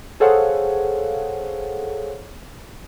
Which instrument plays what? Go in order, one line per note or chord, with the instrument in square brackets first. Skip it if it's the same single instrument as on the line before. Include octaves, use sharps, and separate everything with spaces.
[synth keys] G#4 A4 C5 C#5 F5 F#5